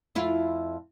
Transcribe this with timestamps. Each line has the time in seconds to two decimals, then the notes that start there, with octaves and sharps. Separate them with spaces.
0.15 F2 E4 F4